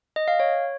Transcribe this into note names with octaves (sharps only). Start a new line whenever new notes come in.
D#5
F5
C#5